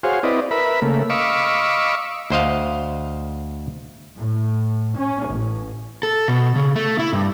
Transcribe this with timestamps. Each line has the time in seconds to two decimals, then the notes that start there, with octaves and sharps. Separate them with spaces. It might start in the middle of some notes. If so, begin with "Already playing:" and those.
0.03 F#4 G#4 C5 C#5 F5
0.23 C4 E4 B4 D5 D#5
0.51 A#4 B4 E5 B5
0.82 C#3 A3 A#3
1.10 D#5 F5 B5 C#6 D6 E6
2.30 D2 C5 D#5 F5
4.16 A2
4.97 C#4
5.27 A1
6.03 A4
6.28 B2
6.56 C#3
6.76 A3
6.99 E4
7.13 G2